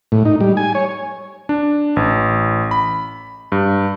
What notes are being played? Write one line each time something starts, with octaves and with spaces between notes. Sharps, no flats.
A2
D#4
G3
G#5
C#5
D4
A1
B5
G2